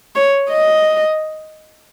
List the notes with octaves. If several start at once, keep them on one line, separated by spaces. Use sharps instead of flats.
C#5
D#5